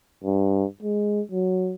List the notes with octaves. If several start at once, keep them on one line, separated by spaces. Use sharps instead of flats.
G2
G#3
F#3